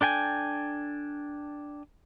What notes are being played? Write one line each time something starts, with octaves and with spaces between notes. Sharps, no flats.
D4 A4 G5 G#5